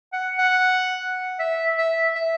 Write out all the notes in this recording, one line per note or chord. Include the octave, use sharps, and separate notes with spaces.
F#5
F#5
E5
E5
E5